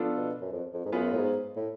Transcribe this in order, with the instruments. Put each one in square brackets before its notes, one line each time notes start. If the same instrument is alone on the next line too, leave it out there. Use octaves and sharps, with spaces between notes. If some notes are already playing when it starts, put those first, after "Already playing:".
Already playing: [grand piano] F3 B3 D4 F4 A4
[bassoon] B2
F#2
F2
F2
G#2
[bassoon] F#2 [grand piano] F#3 B3 F4 G#4 B4
[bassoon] A2
G#2
A2